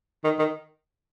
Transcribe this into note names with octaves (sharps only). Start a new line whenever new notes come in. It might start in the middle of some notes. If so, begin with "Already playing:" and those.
D#3
D#3